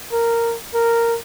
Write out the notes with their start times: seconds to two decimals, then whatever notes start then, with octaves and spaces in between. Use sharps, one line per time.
0.12 A#4
0.74 A#4